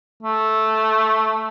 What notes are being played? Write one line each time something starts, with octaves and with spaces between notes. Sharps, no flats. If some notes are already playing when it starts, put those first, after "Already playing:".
A3